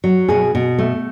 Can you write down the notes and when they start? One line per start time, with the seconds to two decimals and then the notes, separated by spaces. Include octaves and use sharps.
0.04 F#3
0.29 B2 G#4
0.55 B2
0.78 A3